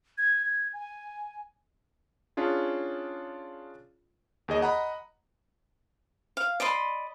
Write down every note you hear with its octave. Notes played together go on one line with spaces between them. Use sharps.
G#6
G#6
G#5
C#4 D4 F4 G#4
D#2 G#4 D#5
D#5 F#5 A#5 B5
F5
D5 D#5 B5 C6